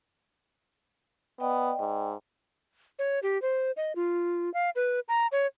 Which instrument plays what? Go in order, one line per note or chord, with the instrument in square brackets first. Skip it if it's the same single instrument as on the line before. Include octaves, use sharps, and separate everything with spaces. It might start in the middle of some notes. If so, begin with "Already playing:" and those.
[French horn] B3 [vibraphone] D5 D#5 G5
[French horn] G#2
[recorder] C#5
G4
C5
D#5
F4
F5
B4
A#5
C#5